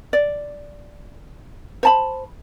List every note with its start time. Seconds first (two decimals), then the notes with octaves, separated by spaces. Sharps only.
0.13 D5
1.83 C5 A5 B5